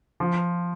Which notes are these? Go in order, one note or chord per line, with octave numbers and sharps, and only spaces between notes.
F3